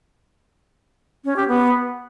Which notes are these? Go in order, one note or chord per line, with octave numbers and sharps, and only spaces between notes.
C#4
G4
B3